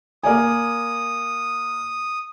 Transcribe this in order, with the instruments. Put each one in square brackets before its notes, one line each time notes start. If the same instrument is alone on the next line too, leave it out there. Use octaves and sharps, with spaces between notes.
[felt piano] A#3 D5 G#5 [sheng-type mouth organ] D#6